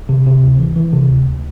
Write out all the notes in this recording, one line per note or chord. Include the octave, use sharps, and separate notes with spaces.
C3
C3
D2
E3
E3
C3
D2
D2